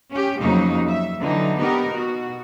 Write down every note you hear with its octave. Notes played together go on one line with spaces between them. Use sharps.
C#4 G4
F2 C#3 F#3 A#3 D#4
E5
D3 E3 F#3 D#4
B3 D#4 G4 A#4
B2 F#4